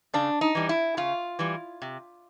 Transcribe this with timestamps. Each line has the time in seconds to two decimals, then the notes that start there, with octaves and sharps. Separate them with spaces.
0.14 C#3 D4
0.41 D#4
0.55 E3 G3
0.69 E4
0.97 C#3 F4
1.39 E3 G3
1.82 C3